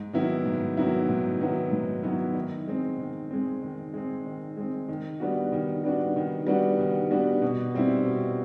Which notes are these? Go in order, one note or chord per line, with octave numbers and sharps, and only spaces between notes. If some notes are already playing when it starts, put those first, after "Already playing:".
Already playing: G#2
D#3 F#3 B3 E4
G#2
D#3 F#3 B3 E4
G#2
D#3 F#3 B3 E4
G#2
D#3 F#3 B3 E4
D#3
G#3 C4
D#3
G#3 C4
D#3
G#3 C4
D#3
G#3 C4
D#3
G3 B3 D4 F#4
D#3
G3 B3 D4 F#4
D#3
G3 B3 D4 F#4
D#3
G3 B3 D4 F#4
B2
G3 C4 E4
B2